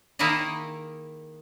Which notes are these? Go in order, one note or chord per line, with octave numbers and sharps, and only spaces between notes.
D#3 A#3 E4 G#4 D#5